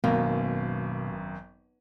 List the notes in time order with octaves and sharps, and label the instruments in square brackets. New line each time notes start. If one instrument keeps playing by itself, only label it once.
[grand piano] G#1 F#2 [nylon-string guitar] B2 [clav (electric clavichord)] A#3